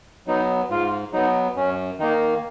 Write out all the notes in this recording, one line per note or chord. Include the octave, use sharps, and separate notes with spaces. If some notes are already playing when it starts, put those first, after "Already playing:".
F#3 B3 D#4
G#2 F4
F#3 B3 D#4
F#2 C#4
D#3 A#3 D#4